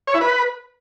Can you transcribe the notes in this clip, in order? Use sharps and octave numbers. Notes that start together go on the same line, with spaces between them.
C#5
E4
B4